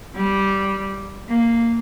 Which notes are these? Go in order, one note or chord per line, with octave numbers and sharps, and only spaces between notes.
G3
A#3